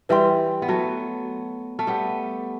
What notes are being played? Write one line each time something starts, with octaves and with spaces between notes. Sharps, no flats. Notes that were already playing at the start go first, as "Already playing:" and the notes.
E3 G3 B4 E5 G5 C6
B3
F#3 A3
A3
G3 B3